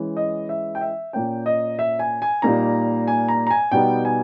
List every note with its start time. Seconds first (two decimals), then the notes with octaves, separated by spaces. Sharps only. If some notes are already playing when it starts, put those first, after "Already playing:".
Already playing: E3 G#3 C#4
0.17 D#5
0.49 E5
0.75 G5
0.81 E5
1.13 A#2 A#3 C#4 G5
1.46 D#5
1.79 E5
1.99 G#5
2.22 G#5
2.42 A#2 G3 A#3 D#4 A#5
3.08 G#5
3.28 A#5
3.47 A#5
3.51 G#5
3.72 B2 G3 B3 D#4 G5
4.05 G#5